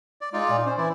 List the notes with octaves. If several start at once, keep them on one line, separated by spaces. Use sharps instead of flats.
D5
G#3 D#4 F4 D5
A#2
C#4 C5
E3 E4 D5